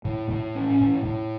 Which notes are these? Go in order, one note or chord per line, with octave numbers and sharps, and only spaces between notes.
A2
A2
C#4
A2
A2